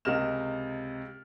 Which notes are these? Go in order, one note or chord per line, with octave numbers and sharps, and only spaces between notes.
C#2 C3 A#4 D#5 F6 E7